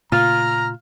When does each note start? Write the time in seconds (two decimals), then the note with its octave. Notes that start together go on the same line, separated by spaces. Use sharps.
0.12 A#2 C#3 A3 F4 A#5 F6